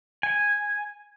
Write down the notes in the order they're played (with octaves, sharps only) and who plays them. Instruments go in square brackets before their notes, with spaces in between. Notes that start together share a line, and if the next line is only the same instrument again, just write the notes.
[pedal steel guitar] G#5